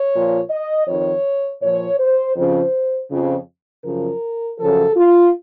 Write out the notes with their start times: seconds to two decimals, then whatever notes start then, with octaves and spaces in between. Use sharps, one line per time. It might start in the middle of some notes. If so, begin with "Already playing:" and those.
Already playing: C#5
0.13 A#2 F3
0.50 D#5
0.87 F2 D#3 C#5
1.62 A#2 F3 C#5
1.99 C5
2.36 F2 C#3 F3 C5
3.11 F2 C#3 F3
3.85 F#2 C#3 F3 A#4
4.59 F#2 C#3 F3 A4
4.96 F4